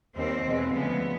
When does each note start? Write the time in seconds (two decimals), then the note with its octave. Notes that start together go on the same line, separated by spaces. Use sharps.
0.16 D#2 D#3 G3 C4
0.44 E2 B2 G#3
0.73 D2 C#3 F3 G#3 B3